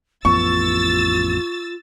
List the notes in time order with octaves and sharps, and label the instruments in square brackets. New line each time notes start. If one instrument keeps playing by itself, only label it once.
[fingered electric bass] A1 F2 B3 [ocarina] F4 [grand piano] C#6 [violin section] E6 A6